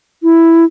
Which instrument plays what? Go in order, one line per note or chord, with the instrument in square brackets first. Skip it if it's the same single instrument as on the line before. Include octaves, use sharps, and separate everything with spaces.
[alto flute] E4